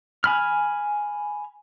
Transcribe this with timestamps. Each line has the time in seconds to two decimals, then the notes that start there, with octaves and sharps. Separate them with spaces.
0.24 G#5 B5 F6